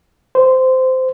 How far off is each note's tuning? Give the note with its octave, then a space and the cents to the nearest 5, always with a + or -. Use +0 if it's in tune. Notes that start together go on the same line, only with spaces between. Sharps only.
C5 -15